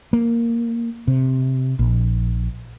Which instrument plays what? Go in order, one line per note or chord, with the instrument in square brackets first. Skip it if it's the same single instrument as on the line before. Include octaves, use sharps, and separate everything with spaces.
[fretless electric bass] A#3
C3
A#1